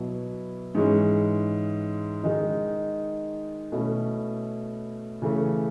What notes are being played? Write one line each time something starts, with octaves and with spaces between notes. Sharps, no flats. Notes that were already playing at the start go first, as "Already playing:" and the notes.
Already playing: B2 F#3 B3 E4
G#2 E3 G#3 C#4
D#3 G#3 D#4
B2 A3 C#4 E4
C#3 E3 A3 C#4